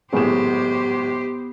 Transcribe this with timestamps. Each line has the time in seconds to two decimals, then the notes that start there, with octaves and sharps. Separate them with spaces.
0.13 G#1 F#2 A2 B3 G4 G#4 C5 E7